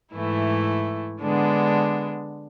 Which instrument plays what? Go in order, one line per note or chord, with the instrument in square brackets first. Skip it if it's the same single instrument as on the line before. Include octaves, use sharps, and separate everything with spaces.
[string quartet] G#2 E3 A3 E4
D3 G#3 B3 D4